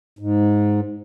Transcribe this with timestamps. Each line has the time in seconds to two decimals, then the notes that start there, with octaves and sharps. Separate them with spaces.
0.19 G#2